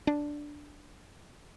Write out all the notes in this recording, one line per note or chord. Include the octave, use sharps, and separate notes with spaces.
D4